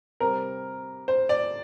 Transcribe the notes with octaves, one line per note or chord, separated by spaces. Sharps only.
C3 G3 C4 A#4
C5
D5